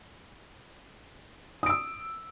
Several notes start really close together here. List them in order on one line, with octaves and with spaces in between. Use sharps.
D#6 D7 E6